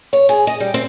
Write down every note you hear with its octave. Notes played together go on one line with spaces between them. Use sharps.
C#5
G#4
D#5
G3
C4